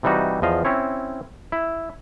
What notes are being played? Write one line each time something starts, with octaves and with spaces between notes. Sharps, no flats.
C3 E3 G3 D#4 F#4
E2 F3 D#5 F5
C4 C#4 E4 C#5
E4